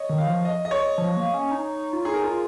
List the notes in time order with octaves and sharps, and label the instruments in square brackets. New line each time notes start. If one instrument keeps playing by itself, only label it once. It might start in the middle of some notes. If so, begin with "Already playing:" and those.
Already playing: [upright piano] C#5 D#5
[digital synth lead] D#3
[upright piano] F5
[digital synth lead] F3
[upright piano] D#5
D#5
C#5
[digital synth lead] F3
A#3
C#4
D#4
F4
[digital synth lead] D#4 [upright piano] G#4
[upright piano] A#4
[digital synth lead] F4 [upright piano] G#4